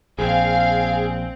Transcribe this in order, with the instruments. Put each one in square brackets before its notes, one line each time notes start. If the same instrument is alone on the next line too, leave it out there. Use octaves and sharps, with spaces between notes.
[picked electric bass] A#1 [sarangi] C4 [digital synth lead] G#4 [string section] F5